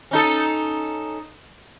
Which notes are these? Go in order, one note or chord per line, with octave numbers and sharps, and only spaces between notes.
C#4 D#4 A4